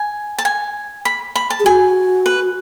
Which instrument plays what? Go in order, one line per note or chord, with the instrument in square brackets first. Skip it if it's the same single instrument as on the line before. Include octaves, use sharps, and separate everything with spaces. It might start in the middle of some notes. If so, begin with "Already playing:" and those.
Already playing: [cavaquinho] G#5
A5
G#5
B5
B5
A5
[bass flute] G#4
[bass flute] F#4 [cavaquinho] G#5
[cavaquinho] B4